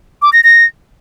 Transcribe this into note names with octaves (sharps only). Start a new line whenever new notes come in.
D6
A#6
A#6